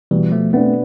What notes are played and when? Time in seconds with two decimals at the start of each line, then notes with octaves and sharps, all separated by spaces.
0.11 B2 E3 G3
0.32 F3 A3
0.53 A3 B3 C4 D4